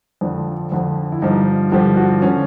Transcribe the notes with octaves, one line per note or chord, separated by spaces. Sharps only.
F2 D3 F3 D4
F2 D3 F3
E4
G2 D3 F3 D#4
G2 D3 F3 G4
F#4
D3 F3 C#4